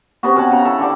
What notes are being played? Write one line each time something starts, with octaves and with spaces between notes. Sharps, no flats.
C3 B3 C#4 F#4
B2 C#4 F#5 A5
C#3 A#5
E4 A4
D3 G4 A4 D5